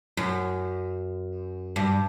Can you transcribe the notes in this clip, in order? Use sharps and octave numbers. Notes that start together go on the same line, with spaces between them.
F#2
G2